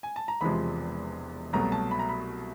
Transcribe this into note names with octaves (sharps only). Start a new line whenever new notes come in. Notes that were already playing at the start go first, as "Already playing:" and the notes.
G#5
A5
A#5
E1 E2 C3 F3 G#3 B5
C2 B2 F#3 A3 A#5
A5
B5
A#5
B5